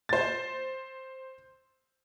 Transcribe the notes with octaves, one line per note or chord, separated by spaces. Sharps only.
C5 A6